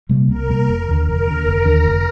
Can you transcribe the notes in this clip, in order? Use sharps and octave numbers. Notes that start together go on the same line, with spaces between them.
C3 G3 A#3
C2 A#4
C3 G3 A#3
F1
D#2 D3
F1 A#4
D#2 D3
F1
D#2 D3
F1